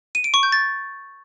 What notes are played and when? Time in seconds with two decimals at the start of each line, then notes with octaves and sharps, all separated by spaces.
0.15 D#7
0.24 D7
0.34 C#6
0.43 G6
0.52 A6